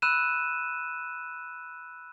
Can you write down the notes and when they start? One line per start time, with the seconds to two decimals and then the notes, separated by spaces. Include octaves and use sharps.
0.02 B5 E6 F#6 D#7 E7